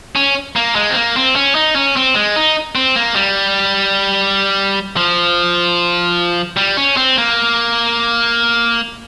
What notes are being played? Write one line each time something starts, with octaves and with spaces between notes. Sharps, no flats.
C#4
A#3
G#3
C4
A#3
C4
C#4
D#4
C#4
C4
G#3
D#4
C4
A#3
G3
F3
G3
C#4
C4
A#3